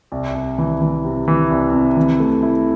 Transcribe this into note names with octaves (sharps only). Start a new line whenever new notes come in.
C2
C2
E3
E3
C3
E3
C2
C3
E3
A3
E4